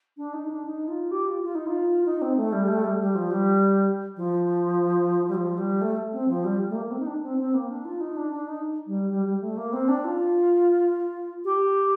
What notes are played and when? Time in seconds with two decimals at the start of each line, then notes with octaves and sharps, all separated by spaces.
0.17 D4
0.33 D#4
0.49 D4
0.65 D#4
0.88 F4
1.11 G4
1.28 F4
1.43 F4
1.55 D#4
1.67 F4
2.06 D#4
2.22 C4
2.37 A3
2.52 G3
2.68 A3
2.84 G3
3.00 G3
3.15 F3
3.31 G3
4.17 F3
5.28 G3
5.34 F3
5.58 G3
5.81 A3
6.13 C4
6.28 F3
6.44 G3
6.70 A3
6.75 A#3
6.91 C4
6.99 D#4
7.07 D4
7.22 C4
7.38 C4
7.54 A#3
7.70 D4
7.85 F4
8.00 D#4
8.16 D4
8.32 D4
8.48 D#4
8.87 G3
9.11 G3
9.26 G3
9.41 A3
9.57 A#3
9.73 C4
9.88 D4
10.05 F4
11.45 G4